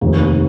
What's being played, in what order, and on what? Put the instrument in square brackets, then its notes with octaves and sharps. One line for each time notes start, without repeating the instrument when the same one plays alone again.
[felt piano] F1 D#2 D#3